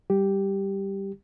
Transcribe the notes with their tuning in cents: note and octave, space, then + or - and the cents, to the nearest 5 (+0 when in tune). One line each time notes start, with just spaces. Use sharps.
G3 +0 G4 +0